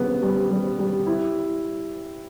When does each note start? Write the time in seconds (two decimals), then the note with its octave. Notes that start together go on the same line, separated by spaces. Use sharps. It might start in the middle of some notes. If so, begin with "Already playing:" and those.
Already playing: C#3 G3 B3
0.22 G3
0.51 G3
0.79 G3
1.07 E4